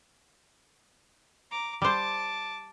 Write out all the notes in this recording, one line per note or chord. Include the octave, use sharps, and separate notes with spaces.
A#5 D6
G3 C5 A5 D6